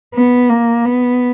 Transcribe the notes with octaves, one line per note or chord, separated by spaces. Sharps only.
B3
A#3
B3